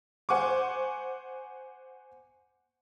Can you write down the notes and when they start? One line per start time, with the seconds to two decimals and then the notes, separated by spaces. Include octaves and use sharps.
0.29 C5 F#5 G#5 C#6 D6